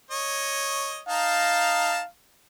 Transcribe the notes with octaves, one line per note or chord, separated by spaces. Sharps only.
C#5 D#5
D#4 F5 A5 A#5